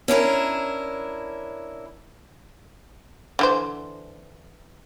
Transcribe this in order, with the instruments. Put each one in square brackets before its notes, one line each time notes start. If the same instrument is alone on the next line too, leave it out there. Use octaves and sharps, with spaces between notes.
[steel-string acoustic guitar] C#4 D4 E4 A#4
[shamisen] D3 E3 C5